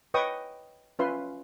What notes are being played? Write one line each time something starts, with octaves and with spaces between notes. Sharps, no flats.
B4 C#5 D#5 G5 C#6 D#6
C#4 F4 B4 E5 C6